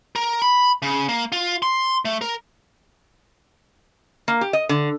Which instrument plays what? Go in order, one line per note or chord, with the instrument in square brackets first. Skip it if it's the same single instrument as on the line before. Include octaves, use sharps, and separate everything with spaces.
[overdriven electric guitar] A#4
B5
C#3
A#3
F4
C6
A3
A#4
[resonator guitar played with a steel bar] A#3
G4
D#5
D3